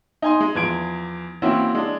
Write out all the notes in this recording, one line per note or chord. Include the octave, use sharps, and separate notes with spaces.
D#4 G#5 C6
G#3
E2 F3 G#6 D7
E3 A#3 C4 C#4 E4 F#4
G#3 D4